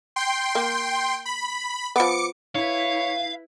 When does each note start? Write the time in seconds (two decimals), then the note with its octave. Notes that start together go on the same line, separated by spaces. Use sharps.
0.16 G5 C6
0.55 A#3
1.25 B5
1.96 F3 B3 D6 C#7
2.55 E4 B4 C#5 F5